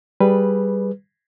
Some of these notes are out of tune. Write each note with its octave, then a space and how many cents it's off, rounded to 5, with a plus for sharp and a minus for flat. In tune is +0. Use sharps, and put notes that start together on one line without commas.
G3 +0 G#4 +0 B4 +0